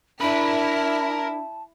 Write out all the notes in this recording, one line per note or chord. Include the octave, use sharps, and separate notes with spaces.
D4 E4 A#4 A5 B5